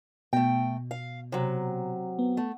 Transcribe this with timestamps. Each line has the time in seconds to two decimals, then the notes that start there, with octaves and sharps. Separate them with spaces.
0.33 B2 A3 G5
0.91 F5
1.32 C3 F#3
2.19 B3
2.37 A3